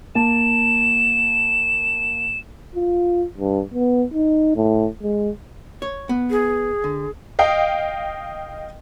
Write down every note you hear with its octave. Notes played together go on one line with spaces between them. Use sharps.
A#3 A5 E7
F4
G2
B3
D#4
A2
G#3
C#5
B3
G#4
D3
D#5 F5 G5